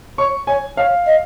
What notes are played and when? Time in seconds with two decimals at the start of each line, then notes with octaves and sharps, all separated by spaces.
0.18 C#5 C#6
0.47 C#5 G#5
0.77 C#5 F5
1.06 D#5